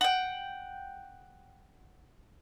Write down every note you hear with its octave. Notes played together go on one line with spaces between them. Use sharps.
F#5 G5